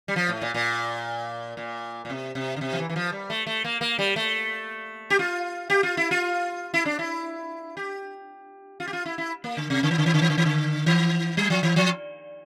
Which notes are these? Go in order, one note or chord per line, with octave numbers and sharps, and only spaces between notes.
G3
F3
A2
A#2
A#2
A#2
A#2
C3
C3
D3
C3
F3
E3
E3
F3
G3
A3
A3
A#3
A#3
G3
A3
G4
F4
G4
F4
E4
F4
E4
D4
E4
G4
F4
G4
F4
E4
E4
A#3
D3
C3
D3
E3
D3
E3
D3
E3
D3
E3
D3
E3
G3
F3
E3
F3